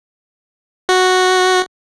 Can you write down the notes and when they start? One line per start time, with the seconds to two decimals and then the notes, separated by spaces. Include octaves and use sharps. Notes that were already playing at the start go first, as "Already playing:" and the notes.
0.89 F#4